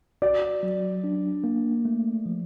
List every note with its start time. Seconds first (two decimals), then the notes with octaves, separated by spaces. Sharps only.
0.22 F#4 D5
0.63 F#3
1.04 D4
1.44 A#3
1.85 A3
2.26 F3